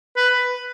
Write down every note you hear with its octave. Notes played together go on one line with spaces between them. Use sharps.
B4